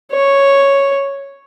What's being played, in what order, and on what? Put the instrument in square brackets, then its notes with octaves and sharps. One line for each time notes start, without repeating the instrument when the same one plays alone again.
[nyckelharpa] C#5